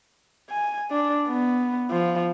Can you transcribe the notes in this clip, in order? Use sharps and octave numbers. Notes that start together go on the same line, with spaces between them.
G#5
D4
B3
F3